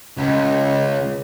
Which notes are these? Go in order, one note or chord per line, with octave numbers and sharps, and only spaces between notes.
C#2